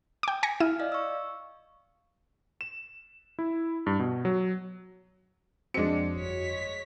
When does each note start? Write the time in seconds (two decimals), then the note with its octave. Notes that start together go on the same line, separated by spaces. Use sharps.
0.23 G5 D6
0.43 G#5 A#6 C#7
0.60 E4 F6 D#7
0.79 D5 D#5 F5
0.92 C#6 E6
2.61 E7
3.39 E4
3.86 G2
3.99 B2
4.25 F#3
5.74 F2 G#3 C4 D4 F#4 C#7
6.16 G1 C#5 B6